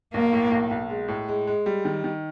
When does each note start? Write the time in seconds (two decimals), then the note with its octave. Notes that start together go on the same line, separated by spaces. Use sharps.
0.14 B1 A#3
0.33 A2
0.51 B1
0.71 B1
0.90 G#3
1.08 A2
1.29 G#3
1.47 G#3
1.66 G3
1.85 D#3
2.04 D#3